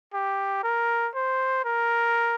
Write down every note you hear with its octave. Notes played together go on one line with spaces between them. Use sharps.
G4
A#4
C5
A#4